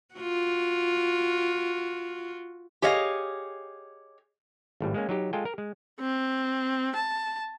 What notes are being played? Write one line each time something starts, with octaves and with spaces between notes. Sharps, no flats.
F4 F#4
G4 G#4 C#5 D#5 F5
G#1 A2 G3
G#3 A#3 C#4
F#3 D#4 G4
G#3 F4 A4 G5 G#5
A#4
G#3
C4
A5